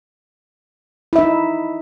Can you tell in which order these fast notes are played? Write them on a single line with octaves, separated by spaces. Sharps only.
E4 E5 D#4